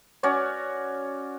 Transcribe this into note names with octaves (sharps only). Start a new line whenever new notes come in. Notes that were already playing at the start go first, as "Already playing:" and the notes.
C#4 F#4 C#5 D5